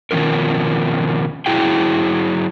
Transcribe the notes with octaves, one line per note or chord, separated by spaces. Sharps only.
B2 D#3 F3 C#4 A#4
F#3 E4 G#4 G5